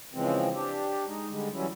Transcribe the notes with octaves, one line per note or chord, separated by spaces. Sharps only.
C#3 E3 F3 G#3 C4
D4 G4
G#3 D#4
D3 G3 G#3
E3 F#3 G3 C#4 E4